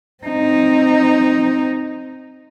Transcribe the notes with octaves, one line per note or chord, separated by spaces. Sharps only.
C4 D#4